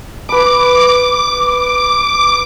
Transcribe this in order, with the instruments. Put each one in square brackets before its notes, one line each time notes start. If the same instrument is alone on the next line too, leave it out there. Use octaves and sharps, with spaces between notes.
[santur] B4 B5 [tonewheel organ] D6